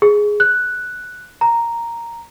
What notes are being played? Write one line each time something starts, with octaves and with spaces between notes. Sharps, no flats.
G#4
F#6
A#5